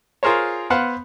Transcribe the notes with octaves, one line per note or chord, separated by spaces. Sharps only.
F4 G#4 A#4 C5 C#5
B3 C5 F5 F#5